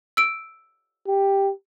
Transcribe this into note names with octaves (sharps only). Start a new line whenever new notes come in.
E6 D7
G4